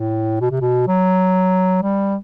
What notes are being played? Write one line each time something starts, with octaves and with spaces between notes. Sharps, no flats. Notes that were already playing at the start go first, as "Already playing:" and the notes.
Already playing: A2
B2
C3
B2
F#3
G3